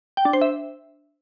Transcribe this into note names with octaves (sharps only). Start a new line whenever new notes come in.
G5
D4
C5
E5